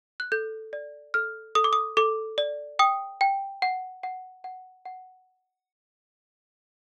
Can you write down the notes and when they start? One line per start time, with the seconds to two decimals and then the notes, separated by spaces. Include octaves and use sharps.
0.20 F#6
0.32 A4 G6
0.73 D5
1.14 A4 F6
1.55 A4 D#6
1.64 D6
1.73 D#6
1.97 A4 D6
2.38 D5
2.79 G5 D#6
3.21 G5
3.62 F#5
4.03 F#5
4.44 F#5
4.85 F#5